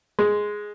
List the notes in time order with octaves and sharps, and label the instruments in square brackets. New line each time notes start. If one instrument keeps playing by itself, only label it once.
[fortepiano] G#3